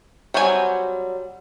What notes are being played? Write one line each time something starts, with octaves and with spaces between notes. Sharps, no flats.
F#3 G3 C4 F4 G#5